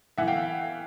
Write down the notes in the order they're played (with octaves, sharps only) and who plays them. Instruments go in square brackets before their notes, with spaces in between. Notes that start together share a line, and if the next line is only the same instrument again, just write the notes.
[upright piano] E3 E5 F#5
F5 G5